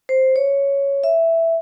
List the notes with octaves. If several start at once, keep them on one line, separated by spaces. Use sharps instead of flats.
C5
C#5
E5